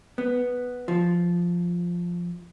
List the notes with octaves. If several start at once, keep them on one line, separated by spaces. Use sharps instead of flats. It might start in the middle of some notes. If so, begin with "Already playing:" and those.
B3
F3